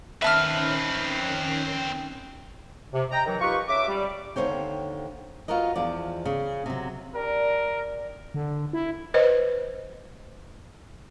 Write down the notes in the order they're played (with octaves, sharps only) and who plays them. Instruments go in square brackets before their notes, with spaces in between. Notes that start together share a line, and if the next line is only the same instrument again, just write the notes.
[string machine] D#3 C#4 C7 [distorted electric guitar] C4 B4 [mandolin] E5 A5 F6
[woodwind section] C3
D#5 G5 A#5
D#3 E3 F#3
D#4 F4 G4 B4 C#6
C#3 E5 D6
G3
[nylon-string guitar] D#2 D3 F4 C5 C#5 G5
F4 F#4 A#4 B4 D#5
E2 F3 D5
C#3
C3 F#3
[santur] G3 D4 D6 [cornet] A#4
[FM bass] D3
E4
[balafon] B4 C5 D#5